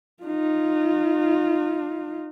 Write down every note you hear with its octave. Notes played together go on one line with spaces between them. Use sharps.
D#4 F4